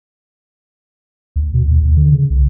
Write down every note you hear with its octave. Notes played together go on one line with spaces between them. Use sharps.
D2
B2
D#2
D#2
D3
C#3
C2